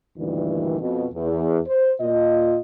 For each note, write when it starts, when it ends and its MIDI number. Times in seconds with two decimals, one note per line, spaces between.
0.18 0.80 38
0.18 0.80 43
0.18 0.80 46
0.18 0.80 51
0.18 0.80 52
0.80 1.06 41
0.80 1.06 47
1.14 1.59 40
1.67 1.92 72
2.01 2.59 46
2.01 2.59 65
2.01 2.59 75